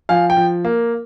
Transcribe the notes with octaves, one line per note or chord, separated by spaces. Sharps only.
F3 F5 G#5
G5
F3
A#3